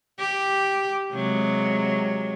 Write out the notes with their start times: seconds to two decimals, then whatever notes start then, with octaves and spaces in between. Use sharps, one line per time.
0.19 G4
1.12 C3 F#3 G#3